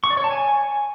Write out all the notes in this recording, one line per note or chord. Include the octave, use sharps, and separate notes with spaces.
C#6
D5
C#5
A5
G#5